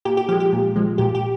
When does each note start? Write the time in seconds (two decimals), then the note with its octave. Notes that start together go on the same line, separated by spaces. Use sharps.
0.05 A#2 G4
0.17 G4
0.29 F3 G4
0.32 G#3
0.40 G4
0.53 A#2
0.76 F3 G#3
0.98 A#2 G4
1.15 G4